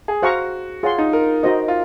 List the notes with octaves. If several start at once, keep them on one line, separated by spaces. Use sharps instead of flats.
G#4
F#4 C5 F5 A#5 C#6
F4 G#4 C#5 F#5 C6
D#4
A#4
D#4 F#4 C5 D#5
F4